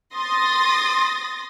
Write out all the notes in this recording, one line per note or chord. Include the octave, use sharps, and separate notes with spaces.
C6 D#6 A6 A#6